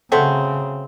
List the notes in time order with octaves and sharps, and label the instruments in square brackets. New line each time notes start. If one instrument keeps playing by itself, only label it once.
[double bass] C#3 [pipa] F#3 A3 C4